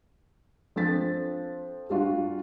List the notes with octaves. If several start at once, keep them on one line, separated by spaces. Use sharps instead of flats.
F3 C4 D4 A4 A6 B6
G3 D4 F4 F#4